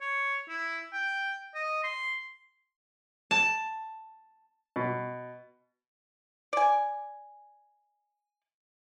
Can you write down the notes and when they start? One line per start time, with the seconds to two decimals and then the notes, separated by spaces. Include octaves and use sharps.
0.01 C#5
0.48 E4
0.93 G5
1.55 D#5
1.83 C6
3.31 A5
4.76 B2
6.53 D5 G#5